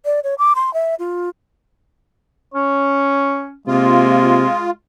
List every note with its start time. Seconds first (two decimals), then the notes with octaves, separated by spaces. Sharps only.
0.05 D5
0.24 C#5
0.38 D6
0.55 C6
0.74 E5
0.99 F4
2.54 C#4 C#5
3.67 C3 G#3 A#3 F4